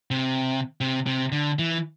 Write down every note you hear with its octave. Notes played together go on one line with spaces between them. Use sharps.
C3
C3
C3
D3
E3